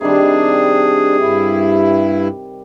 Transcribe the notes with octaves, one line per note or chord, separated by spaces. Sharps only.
C3 D#3 G3 D4 G#4
G2 E4